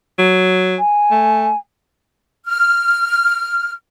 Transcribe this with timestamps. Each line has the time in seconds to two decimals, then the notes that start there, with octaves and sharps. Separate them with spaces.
0.18 F#3
0.78 G#5
1.11 A3
2.46 F6